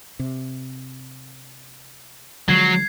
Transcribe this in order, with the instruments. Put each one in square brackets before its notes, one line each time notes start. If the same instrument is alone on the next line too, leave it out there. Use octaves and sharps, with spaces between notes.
[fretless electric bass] C3
[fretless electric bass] D3 F3 G#3 [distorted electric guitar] F#3 [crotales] G#6 C7